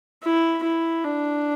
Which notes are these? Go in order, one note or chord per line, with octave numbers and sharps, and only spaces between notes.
E4
E4
D4